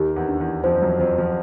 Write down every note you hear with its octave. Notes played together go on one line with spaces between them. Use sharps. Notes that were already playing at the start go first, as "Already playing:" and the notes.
Already playing: D#2 D#3 G4
E2 E3
D4
E2 E3
F2 F3 C5
F#2 F#3
F2 F3 C5
F2 F3